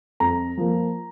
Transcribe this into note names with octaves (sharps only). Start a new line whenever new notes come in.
F2 A#5
F3 A#3